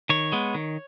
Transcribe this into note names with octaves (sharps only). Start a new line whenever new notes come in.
D#3 C#5
G#3 B3
D#3